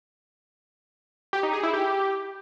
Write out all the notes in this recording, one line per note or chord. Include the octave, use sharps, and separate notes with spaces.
G4
D#4
G#4
E4
G4